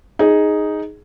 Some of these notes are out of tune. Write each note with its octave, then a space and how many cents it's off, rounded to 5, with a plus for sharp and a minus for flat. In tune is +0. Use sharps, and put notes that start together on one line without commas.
D#4 +0 G#4 +0